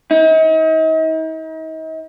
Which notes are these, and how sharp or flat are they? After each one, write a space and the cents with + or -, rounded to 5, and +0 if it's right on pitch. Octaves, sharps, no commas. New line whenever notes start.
D#4 +40